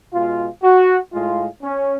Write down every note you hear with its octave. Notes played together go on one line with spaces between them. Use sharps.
B2 G#3 F4
F#4
A2 G#3 F4
C#4